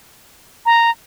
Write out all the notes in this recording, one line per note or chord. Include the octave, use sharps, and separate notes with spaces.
A#5